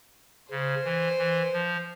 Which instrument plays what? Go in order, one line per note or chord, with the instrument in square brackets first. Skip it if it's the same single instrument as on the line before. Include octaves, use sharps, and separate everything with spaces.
[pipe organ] C#3 [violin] C5
[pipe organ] E3
E3
F3